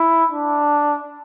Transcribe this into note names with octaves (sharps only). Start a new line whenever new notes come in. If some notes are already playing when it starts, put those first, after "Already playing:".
Already playing: E4
D4